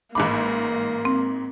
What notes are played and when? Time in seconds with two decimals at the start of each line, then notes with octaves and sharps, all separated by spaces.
0.15 A1 G#2 A#3 B5 D6
1.05 C4